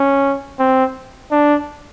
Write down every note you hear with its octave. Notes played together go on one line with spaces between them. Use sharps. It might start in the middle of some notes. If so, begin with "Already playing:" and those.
Already playing: C#4
C4
D4